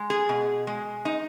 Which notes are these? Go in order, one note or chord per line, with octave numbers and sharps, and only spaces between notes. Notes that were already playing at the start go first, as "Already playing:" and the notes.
Already playing: G#3
G#4
B2
G#3
D#4